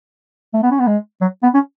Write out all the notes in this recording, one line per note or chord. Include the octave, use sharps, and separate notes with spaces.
A3
B3
C#4
B3
G#3
F#3
B3
C#4